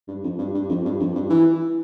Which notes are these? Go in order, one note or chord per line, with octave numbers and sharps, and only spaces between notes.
G2
F2
G2
G2
F2
G2
F2
G2
E3